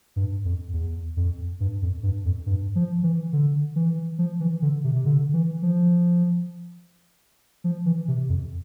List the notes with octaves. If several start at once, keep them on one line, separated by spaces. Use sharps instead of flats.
G2
F2
E2
F2
G2
F2
G2
F2
G2
F3
E3
D3
E3
F3
E3
D3
C3
C3
D3
E3
F3
F3
E3
C3
F2